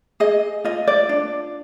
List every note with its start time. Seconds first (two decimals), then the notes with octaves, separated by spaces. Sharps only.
0.20 G#4 D#5
0.64 F4 D#5
0.87 D5
1.09 D4